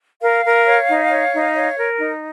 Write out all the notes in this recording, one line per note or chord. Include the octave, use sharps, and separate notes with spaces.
A#4 F5
A#4
C#5
D#4
C#5
D#4
C#5
A#4
D#4